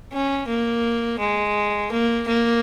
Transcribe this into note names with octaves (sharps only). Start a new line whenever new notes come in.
C#4
A#3
G#3
A#3
A#3